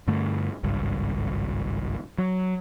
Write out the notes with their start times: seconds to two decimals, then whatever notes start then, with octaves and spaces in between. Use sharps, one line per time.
0.08 G2 D3 A3
0.63 G#1 C#2 G2
2.18 F#3